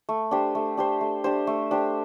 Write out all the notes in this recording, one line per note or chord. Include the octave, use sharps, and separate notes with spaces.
A3
D4 G4 C5
A3
D4 G4 C5
A3
D4 G4 C5
A3
D4 G4 C5